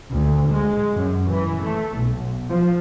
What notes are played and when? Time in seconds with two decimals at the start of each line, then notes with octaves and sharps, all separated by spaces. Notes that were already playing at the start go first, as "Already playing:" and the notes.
0.11 D2
0.49 G#3
0.93 F#2
1.29 E3
1.62 A3
1.97 B1
2.50 F3